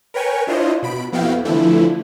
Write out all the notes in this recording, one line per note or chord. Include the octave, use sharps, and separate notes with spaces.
A#4 B4 C#5 G5 G#5 C#6
D4 E4 F4 C5 C#5 D#5
B2 B5 D7
F2 B3 E4 F#4 F5 G5
D3 E3 F3 A3 E4